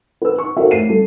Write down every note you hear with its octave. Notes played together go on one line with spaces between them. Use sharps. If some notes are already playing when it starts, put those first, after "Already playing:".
B4 E6
C#6
F#4 A4 A#4 C5 E5 F5
A1 C7 D#7
G3 A4